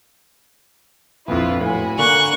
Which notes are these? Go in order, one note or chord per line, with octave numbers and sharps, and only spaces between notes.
A#1 F2 E4 F4 B4
A2 F#4 G#5 B5
D3 A#3 C#6 F#6